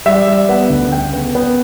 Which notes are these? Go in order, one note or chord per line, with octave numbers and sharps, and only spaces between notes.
G3 E5
G3
B3 F#5
D2
C#3 G5
B3
B3